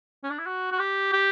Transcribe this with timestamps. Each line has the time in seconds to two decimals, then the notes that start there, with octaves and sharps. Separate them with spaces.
0.23 C#4
0.30 D4
0.39 E4
0.46 F#4
0.72 F#4
0.79 G4
1.13 G4